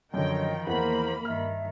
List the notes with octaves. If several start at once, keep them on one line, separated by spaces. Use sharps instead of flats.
F#2 D3 D#3 F3 C#5 D#5 G5
E2 E3 A#3 A#4 C5 F#5 B5
G2 D#3 E5 F6